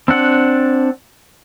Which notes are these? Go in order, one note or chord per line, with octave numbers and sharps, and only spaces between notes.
C4 D4 F#5